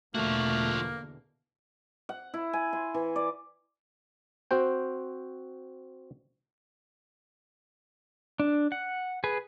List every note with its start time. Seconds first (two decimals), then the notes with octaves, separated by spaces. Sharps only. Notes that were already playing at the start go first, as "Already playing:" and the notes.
0.15 E2 B2 D3 F3 A3 A#3 F#4
2.09 F#5
2.34 E4
2.53 G#5
2.73 C6
2.94 E3
3.16 D5
4.51 C4 F#4 C5 G5
8.40 D4
8.72 F#5
9.24 G#4 B4